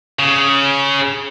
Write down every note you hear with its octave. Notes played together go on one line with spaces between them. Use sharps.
C#3